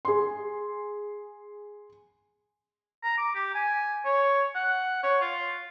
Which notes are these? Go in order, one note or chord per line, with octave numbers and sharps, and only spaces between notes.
G#4 C6
A#5
D6
G4
G#5
C#5
F#5
C#5
F4